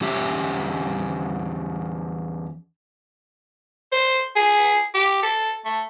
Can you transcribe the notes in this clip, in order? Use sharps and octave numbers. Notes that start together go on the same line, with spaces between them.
E2 C#4 G4 E5
C5
G#4
G4
A4
A3